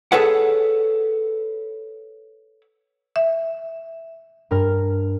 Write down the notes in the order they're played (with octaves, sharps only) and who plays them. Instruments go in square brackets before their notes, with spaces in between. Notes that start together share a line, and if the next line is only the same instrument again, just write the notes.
[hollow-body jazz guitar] G#4 A4 B4 C#5 F#5
[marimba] E5
[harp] G2 A#4 F6